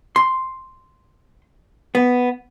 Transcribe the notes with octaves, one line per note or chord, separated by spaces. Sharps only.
C6
B3